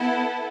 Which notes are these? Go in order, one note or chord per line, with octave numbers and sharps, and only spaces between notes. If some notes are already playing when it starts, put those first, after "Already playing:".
Already playing: B3 E4 A4